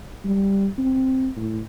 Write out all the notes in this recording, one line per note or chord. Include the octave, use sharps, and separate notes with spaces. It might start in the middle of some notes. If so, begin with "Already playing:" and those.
G3
C4
A2